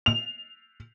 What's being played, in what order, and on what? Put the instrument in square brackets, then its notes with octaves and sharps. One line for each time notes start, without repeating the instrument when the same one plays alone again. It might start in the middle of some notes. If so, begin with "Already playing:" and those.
[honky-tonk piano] F7